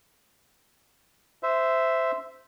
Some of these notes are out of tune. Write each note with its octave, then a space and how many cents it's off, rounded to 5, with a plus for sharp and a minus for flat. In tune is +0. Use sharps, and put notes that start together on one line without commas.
C5 -15 E5 +0